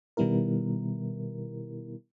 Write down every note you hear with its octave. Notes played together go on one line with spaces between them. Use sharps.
B2 D#3 G3 B3 E4 A#4